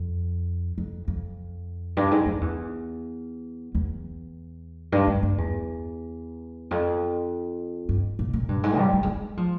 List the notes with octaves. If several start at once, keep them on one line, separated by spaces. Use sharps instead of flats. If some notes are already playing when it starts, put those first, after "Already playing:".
Already playing: F2
F2
F2
G2
G#2
F2
E2
E2
G2
G2
G2
E2
F2
G2
A#2
A#2
G2
G#2
G3
G#3
G3
G#3
F3